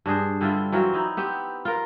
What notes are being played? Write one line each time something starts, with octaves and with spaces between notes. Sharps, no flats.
G2 D4 G#4 C5
D3 G3 E4 F4
E3 F#3 C4 F4
D#4 E4
B3 C4 G4
F4 A#4